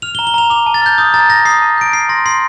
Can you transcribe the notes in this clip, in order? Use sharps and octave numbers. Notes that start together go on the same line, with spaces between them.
F6 F7
G7
A#5
G7
A#5 F7
D6 F7
A5
A6
F6 G6
D#6 G6
A#5 A6
G6 A#6
D#6 C7
A5
G6 D7
F6 C7
C6 A#6
C6 C7